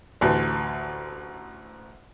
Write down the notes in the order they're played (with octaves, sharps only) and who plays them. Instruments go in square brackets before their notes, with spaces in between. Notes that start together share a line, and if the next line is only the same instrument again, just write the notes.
[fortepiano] A1 D2 E3 A5